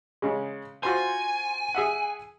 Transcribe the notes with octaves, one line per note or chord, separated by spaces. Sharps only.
C#3 G#3
F4 F#4 C5 G#5
G#4 E5 F#5